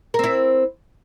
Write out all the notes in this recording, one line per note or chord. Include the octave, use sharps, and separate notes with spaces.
C4 E4 A#4